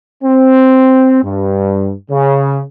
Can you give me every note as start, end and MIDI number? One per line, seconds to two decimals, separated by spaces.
0.24 1.23 60
1.23 1.92 43
2.11 2.61 49